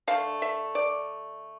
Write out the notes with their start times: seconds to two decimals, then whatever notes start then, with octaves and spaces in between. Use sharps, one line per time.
0.08 D3 A3 F5
0.42 E5
0.75 D5